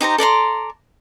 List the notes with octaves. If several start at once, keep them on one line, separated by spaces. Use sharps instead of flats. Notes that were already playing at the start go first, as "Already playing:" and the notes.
D#4 G4 C5 A#5
A4 D5 A#5 C6